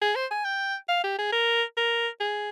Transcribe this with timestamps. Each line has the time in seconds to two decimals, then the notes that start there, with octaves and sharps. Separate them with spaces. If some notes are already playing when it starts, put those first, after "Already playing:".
0.02 G#4
0.15 C5
0.31 G#5
0.45 G5
0.88 F5
1.04 G4
1.18 G#4
1.32 A#4
1.77 A#4
2.20 G#4